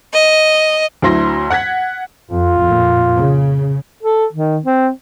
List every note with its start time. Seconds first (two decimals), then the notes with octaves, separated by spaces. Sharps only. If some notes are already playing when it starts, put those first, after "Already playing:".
0.12 D#5
1.02 D2 F#3 E4 C6 A#6
1.50 F#5 F#6 G#6 B6
2.31 F2 F4
2.63 F2 A#2
3.18 C#3
4.03 A4
4.33 D#3
4.65 C4